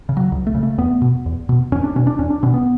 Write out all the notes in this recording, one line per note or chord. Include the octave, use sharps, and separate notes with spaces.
C#3
F#3
C#2
A3
C#3
A3
E2 B3
B2
E2
B2
E2 C#4
D4
B2 C#4
D4
E2 C#4
D4
B2 C#4
B3